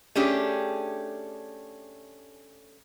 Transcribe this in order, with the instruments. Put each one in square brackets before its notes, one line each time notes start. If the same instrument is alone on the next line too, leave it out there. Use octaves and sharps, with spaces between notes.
[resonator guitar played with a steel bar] A3 C#4 D4 G4 G#4